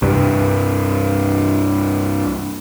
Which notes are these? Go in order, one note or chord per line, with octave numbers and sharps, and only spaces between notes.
C2 G2